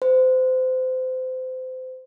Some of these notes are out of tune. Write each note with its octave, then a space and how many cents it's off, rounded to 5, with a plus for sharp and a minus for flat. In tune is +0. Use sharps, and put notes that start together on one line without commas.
C5 -30